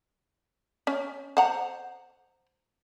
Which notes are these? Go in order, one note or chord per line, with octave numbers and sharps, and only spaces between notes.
C#4
C5 F#5 A#5